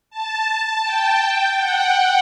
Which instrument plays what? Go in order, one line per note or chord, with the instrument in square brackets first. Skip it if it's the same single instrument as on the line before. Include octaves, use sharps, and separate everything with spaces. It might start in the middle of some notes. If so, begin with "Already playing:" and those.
[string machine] A5
G5
F#5